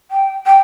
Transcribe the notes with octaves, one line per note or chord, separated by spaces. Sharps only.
G5
G5